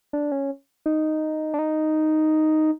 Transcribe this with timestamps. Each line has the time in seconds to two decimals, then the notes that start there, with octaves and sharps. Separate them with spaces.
0.13 D4
0.31 C#4
0.86 D#4
1.54 D4
1.59 D#4